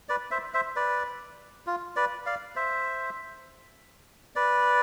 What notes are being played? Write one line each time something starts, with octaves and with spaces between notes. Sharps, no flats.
B4 D5
C5 E5
C5 E5
B4 D5
F4
B4 D5
D5 F5
C5 E5
B4 D5